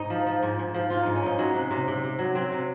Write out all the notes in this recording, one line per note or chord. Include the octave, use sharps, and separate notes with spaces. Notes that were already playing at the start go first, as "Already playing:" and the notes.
Already playing: G#2 D#4
F3
F3
G#2
G#2
F3
G#2 F4
G#2 D#4
C#4
G#2 D#4
F#3 C#4
C3
C3
C3
C3
F#3
F#3 C4
C3